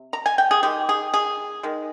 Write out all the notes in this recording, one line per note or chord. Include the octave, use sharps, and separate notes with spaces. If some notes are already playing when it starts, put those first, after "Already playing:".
Already playing: C3
A#5
G#5
G5
G#4
D#3 G#3 G4
G#4
G#4
D#3 G#3